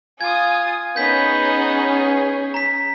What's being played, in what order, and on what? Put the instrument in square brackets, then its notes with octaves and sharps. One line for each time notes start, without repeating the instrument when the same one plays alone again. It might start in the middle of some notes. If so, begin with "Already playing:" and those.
[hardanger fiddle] F4 [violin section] G#5 D#6 [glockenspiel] G#6
[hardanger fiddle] B3 D#4 [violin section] C#4 G#4 [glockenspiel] G6 B6
[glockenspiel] A#5 B6